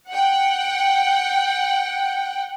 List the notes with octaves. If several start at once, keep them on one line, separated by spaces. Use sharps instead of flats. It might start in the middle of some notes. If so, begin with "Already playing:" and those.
F#5 G5